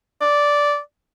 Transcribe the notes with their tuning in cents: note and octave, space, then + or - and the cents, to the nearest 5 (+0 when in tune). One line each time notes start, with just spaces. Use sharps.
D5 -10